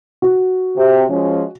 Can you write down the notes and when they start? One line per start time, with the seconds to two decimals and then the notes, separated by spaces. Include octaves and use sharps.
0.22 F#4
0.77 C3
1.09 F3 G#3 C#4